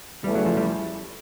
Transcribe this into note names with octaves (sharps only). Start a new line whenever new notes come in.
E2 C#3 E3 G3 A3
F#3
F3
G3